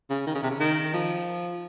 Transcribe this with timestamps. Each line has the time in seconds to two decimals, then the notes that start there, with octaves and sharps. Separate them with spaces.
0.10 C#3
0.26 D#3
0.34 C#3
0.43 C3
0.50 C#3
0.60 D#3
0.93 F3